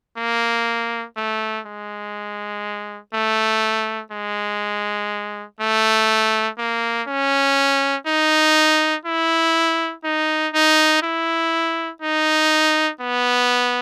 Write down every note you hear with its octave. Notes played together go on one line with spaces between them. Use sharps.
A#3
A3
G#3
A3
G#3
A3
A#3
C#4
D#4
E4
D#4
D#4
E4
D#4
B3